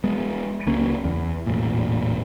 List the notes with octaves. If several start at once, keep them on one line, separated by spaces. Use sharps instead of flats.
G#3 B3
C#2 A#3 C#4
E2
E1 A1 A#2